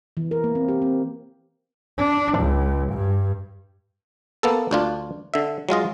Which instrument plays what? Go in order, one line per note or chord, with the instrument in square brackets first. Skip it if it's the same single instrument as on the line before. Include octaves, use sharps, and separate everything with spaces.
[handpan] E3
A#4
A#3
C4
G4
C4
[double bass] D4
C#2
G2
[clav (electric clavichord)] A#3 B3 A4
D2 D4 F4
D3 E5
F#3 G#3 F4 D#5